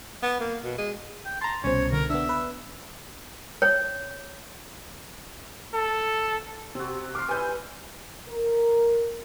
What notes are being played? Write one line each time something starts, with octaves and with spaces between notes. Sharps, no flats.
B3
A#3
B2
G#3
G5
A5 A#5 C6
C2 B2 C#4 C5 C#5
D3 A#4
B3 D4 E5
B4
C#5
A4
C3 C4 F#4
F5 C6 D6
G3 E4 B4 G#5 G6
A#4